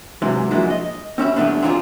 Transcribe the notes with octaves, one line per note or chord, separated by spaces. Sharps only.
G#2 C3 E3 F#3 G#3
F3 F#3 G#3 A#3 D4 E4
D#5
C4 C#4 E5 B5
G2 E3 A3 B3 C4 D4
C4 D4 D#4 F4 F#4 G#4